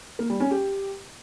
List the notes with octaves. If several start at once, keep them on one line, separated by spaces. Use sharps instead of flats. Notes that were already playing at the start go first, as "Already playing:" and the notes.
A#3
G3
C#4
G4